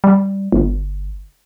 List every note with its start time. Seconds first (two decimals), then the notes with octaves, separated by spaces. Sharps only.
0.04 G3
0.52 G1